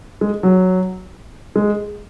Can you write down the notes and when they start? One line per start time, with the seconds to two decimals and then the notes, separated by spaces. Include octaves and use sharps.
0.21 G#3
0.43 F#3
1.56 G#3